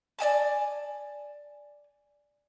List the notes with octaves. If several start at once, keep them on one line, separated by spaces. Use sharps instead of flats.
D5 D#5 G#5 A5